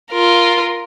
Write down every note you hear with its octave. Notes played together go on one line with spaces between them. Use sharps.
F4 A#4